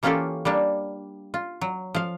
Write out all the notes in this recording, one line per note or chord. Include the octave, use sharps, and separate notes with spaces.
E3 A#3 C#4 F4 G4 A4
G3 A#3 D4
F4
F#3
F3 F5